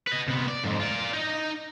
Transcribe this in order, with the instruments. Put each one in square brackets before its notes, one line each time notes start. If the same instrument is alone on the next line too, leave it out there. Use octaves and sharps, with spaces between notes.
[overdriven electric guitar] B4 D#5
C3 B3
D5
F2 G#2
F4 D5
D#4 D#5